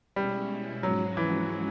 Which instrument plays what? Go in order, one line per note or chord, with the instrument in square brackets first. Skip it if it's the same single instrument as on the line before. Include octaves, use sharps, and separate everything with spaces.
[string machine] B2 G#3 C#4 E4 [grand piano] G3
[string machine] G#2 F3 G#3 C#4 F#4 [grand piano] F#3
[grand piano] E3